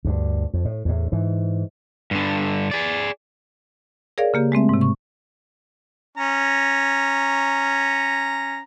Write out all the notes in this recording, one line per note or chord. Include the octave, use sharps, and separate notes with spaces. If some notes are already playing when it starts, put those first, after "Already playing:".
D2 G2
F2
A2
E2 A2
G#2 E3
G2 D3
G#4 D5
G#4 A#4 C#5 D5 F5
C#3 A#3 G4
G#3 A3 C4 E5
G#2 C3
C#6
C#4 A#5